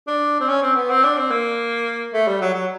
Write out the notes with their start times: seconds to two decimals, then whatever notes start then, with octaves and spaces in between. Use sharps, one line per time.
0.07 D4
0.41 C4
0.49 C#4
0.62 C4
0.76 B3
0.90 C4
1.04 D4
1.18 C4
1.31 A#3
2.13 A3
2.27 G3
2.41 F#3
2.54 F#3